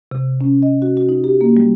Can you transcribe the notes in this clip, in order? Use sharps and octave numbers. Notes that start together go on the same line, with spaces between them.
C3
C#4
D#5
F#4
F#4
D#4
G4
A#3
G3